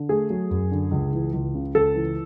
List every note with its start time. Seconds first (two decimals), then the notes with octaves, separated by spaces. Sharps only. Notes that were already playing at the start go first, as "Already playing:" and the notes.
Already playing: D3
0.09 A3 G#4
0.30 F#3
0.50 F#2
0.72 D3
0.91 C#2
1.13 E3
1.34 C#2
1.55 C#3
1.74 C#2 A4
1.95 E3